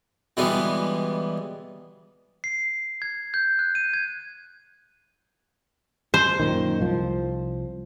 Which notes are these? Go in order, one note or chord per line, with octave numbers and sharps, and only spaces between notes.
B2 D3 E3 G3 G#3 B3
C7
G#6
G6
F#6
D#7
G#6
C5
F#2 A#2 D#3
C2 F3